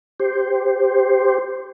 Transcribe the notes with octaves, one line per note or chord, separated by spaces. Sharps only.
G4 C5